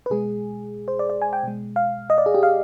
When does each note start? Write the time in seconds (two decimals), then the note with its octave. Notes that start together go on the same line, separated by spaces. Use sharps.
0.06 B4
0.10 B2 G#3 G#4
0.88 C5
0.99 D5
1.10 D5
1.22 G#5
1.33 G5
1.43 B2 G#3
1.76 F5
2.10 D#5
2.18 D5
2.26 G#4
2.35 G4
2.43 F5